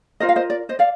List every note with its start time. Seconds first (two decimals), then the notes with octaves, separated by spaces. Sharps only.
0.20 F4 A#4 C5 D#5
0.29 F5
0.36 C5 D#5
0.50 D5
0.69 C5 D#5
0.79 D5 F5